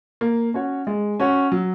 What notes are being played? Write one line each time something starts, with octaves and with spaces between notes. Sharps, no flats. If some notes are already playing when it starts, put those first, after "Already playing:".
A#3
C#4 F#4 C#5
G#3
C#4 F#4 C#5
F#3